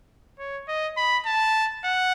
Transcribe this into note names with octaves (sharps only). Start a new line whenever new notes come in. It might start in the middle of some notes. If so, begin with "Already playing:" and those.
C#5
D#5
B5
A5
F#5